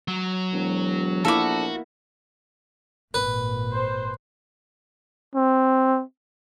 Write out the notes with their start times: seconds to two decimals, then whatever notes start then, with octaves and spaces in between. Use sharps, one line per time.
0.08 F#3
0.53 E1
1.25 A#1 A#3 B3 E4 F#4 A4 D6
3.14 G#1 A#2 B4
3.73 C5
5.35 C4